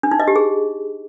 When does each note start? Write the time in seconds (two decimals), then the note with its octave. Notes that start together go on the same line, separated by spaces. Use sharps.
0.03 D4
0.11 D#4
0.19 D#5
0.28 G4
0.36 G#4